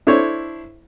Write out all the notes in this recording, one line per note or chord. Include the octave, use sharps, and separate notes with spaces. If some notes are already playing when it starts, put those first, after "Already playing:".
D4 E4 A4 C5 C#5